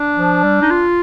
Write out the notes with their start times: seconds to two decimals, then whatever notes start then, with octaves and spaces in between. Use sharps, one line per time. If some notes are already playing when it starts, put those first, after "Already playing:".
Already playing: D4
0.17 F3
0.44 G3
0.62 D#4
0.70 F4